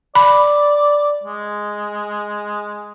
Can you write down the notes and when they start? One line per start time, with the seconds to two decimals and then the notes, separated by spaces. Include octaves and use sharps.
0.15 D5 B5
1.23 G#3